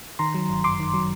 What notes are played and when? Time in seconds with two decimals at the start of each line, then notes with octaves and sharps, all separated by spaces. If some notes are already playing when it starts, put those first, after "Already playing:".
0.19 D#3 A#5 C6
0.34 F#3
0.49 G1
0.64 F#2 C6 D6
0.80 D#3
0.94 F#3